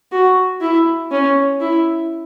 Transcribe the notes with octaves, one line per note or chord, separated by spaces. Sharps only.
F#4
E4
C#4
E4